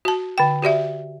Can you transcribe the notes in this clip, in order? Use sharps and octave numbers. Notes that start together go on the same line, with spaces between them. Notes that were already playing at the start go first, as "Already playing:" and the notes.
F#4 A5
D3 G5
F#4 G4 D5 E5